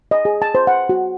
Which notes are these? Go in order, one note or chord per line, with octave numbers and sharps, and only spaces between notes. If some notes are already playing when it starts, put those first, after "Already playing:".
D#5
G#4
A5
C5
F#5
F#4